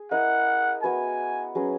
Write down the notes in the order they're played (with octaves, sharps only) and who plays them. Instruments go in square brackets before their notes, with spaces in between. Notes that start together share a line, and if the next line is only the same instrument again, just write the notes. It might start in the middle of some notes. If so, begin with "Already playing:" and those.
Already playing: [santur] G#4
[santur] E4 A#4 D#5 [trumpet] F#5
[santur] B3 F#4 B4 [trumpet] G#5
[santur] F#3 C#4 G#4 B4